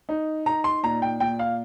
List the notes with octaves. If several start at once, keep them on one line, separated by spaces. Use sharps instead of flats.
D#4
D#4 A#5
C6
A#2 A#5
G5
A#2 G5
F5